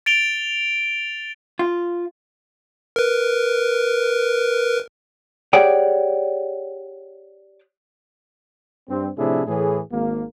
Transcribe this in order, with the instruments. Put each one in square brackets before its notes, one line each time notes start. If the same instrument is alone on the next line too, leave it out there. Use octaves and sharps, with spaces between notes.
[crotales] A6 D7 F7 G7
[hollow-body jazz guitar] F4
[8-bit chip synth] A#4 B4
[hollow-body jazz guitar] G4 G#4 C#5 D5 F#5 G5
[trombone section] G2 C4
A2 C3 F3 D4 E4 G#4
A2 E3 G#4
G#1 A#3